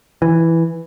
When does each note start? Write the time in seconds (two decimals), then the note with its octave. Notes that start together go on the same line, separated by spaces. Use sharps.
0.22 E3